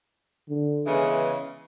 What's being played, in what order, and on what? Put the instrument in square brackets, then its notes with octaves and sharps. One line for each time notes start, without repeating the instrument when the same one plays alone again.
[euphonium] D3
[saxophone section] C#3 E3 G#3 B3